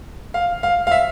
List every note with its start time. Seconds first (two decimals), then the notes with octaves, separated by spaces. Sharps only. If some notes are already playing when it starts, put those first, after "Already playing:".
0.34 F5
0.63 F5
0.87 F5
0.91 E5